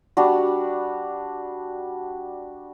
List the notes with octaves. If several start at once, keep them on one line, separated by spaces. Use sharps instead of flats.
G3 D4 F#4